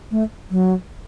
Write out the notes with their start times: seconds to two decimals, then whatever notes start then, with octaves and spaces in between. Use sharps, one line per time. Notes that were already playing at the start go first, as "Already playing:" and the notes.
0.11 A3
0.51 F#3